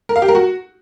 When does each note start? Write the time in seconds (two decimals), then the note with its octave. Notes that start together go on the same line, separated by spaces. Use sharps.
0.09 A#4
0.16 F5
0.22 G4
0.28 A#4
0.35 F#4